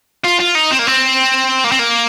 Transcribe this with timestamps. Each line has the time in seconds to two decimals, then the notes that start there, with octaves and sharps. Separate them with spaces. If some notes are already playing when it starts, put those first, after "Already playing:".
0.24 F4
0.40 F4
0.55 D#4
0.71 C4
0.79 A#3
0.87 C4
1.64 A#3
1.72 C4
1.79 A#3